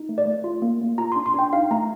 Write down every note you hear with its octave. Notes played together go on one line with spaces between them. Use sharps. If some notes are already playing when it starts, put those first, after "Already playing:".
Already playing: D#4
A3
D5
A3
F4
A#3
A#3
F4 A#5
C6
D4
C6
D4 G5
D#4 F5
A3 A#5